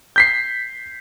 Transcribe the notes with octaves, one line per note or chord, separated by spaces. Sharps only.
G6 B6 C7